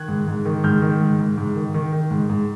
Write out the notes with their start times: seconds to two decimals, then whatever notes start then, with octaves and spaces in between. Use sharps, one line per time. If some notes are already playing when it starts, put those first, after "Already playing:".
Already playing: D#3 F#6 G#6
0.08 G#2
0.28 G#2
0.45 D#3
0.64 G#2 F6 G6
0.82 D#3
1.01 G#2
1.19 G#2
1.38 G#2
1.56 D#3
1.74 D#3
1.92 D#3
2.11 G#2
2.29 G#2